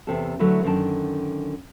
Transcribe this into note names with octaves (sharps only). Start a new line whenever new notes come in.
E2 C3 A4
D3 F#3 A3 E4 A4 B4
F#2 D3 D#3 A#4 A5